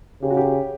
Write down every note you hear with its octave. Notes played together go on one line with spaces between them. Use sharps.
C#3 G4
F#4
G4